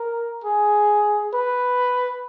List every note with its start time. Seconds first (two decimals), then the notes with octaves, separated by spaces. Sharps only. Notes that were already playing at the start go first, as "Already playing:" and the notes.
Already playing: A#4
0.44 G#4
1.34 B4